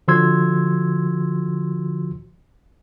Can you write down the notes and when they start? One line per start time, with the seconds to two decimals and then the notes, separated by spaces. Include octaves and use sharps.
0.08 D3 F3 F#4 C6 E6 G#6